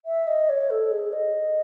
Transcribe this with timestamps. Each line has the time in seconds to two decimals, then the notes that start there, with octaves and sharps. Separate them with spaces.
0.05 E5
0.27 D#5
0.49 C#5
0.70 A4
0.91 G#4
1.12 D#5